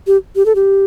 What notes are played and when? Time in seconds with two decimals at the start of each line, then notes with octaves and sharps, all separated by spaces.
0.07 G4
0.36 G4
0.46 A4
0.55 G4